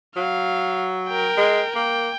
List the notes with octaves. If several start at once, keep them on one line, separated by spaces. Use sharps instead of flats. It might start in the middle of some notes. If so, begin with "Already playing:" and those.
F#3 F5
A#4 G5
G#3
A#3 G5